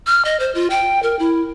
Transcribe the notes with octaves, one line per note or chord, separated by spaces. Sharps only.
F6
D#5
C5
F4
G5
A#4
E4